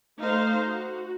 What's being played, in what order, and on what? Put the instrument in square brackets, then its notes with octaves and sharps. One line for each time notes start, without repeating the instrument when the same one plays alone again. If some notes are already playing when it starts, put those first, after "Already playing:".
[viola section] A3 D#4 C5 F5
F#4